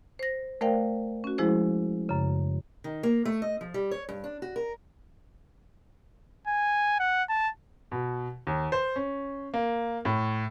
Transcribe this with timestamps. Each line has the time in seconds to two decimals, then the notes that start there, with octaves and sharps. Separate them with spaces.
0.19 C5 A#6
0.61 A3 A#4 C5 D5 F5 G5
1.24 C#4 F#4
1.38 F3 G#3 E4 G#4 C5
2.09 F#2 C#3
2.84 D#3
3.03 A#3
3.25 A3
3.42 D#5
3.61 F3
3.74 G3
3.91 C#5
4.09 G2
4.24 D4
4.42 F#4
4.56 A#4
6.47 G#5
6.99 F#5
7.29 A5
7.92 B2
8.47 D#2
8.72 C5
8.96 C#4
9.54 A#3
10.05 A2